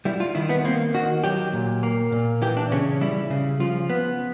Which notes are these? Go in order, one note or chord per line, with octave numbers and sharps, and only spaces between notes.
G3 E4
F4
D#3 E4
B3
A#3 C4
D#3 F#4
F#3 G4
A#2
A#3
A#2
E3 G4
D4
C#3 C#4
G3 E4
C#3
F3 F4
B3